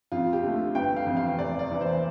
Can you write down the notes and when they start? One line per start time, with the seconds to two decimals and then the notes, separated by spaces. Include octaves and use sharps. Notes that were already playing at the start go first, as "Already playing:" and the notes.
0.12 F2 F4
0.33 G4
0.43 D3 A3
0.75 G1 G5
0.96 F5
1.06 F2 E3 G3
1.17 F5
1.39 F1 D5
1.59 D5
1.71 E2 E3
1.81 C5